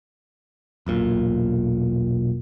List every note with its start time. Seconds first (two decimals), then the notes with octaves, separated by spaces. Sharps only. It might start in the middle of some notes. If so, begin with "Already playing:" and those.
0.86 E1 B1 A#2